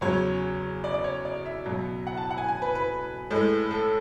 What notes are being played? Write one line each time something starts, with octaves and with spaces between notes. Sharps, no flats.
E2 C#3 F#3 C#5
D5
D5
C#5
D5
E5
C#2 B2 F#3
F#5
A5
F#5
G#5
G#5
B4
B4
A2 G#3
A4